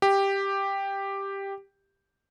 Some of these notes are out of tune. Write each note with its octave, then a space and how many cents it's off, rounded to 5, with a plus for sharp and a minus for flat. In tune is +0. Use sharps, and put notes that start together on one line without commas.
G4 +5